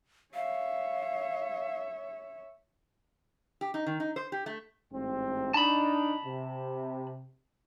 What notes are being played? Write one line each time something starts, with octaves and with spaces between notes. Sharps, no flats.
C#5 E5 F5
G4
D#4
D#3
D#4
C5
G4
A3
A1 G#2 C4
D4 D#4 A5 B5
C3